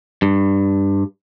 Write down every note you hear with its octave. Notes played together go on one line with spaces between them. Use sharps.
G2